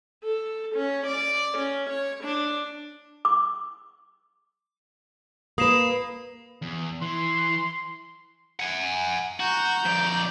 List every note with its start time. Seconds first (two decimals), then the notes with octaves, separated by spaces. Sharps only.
0.24 A4
0.75 C#4
1.06 D5
1.58 C#4
1.90 C#5
2.24 D4
3.25 D6
5.58 A#3 B4 D#6 C7 E7
6.62 E2
7.02 E3 C6
8.60 F#5 G#5
9.40 F#4 A#5 G6
9.86 F2 D5